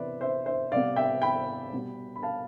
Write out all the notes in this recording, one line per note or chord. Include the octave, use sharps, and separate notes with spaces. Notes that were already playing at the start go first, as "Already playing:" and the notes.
Already playing: C3 E3 B3 B4 C5 D5 E5
C5 E5
C5 E5
C3 G3 B3 D5 F5
E5 G5
G5 B5
B2 G3 B3
B5
F5 A5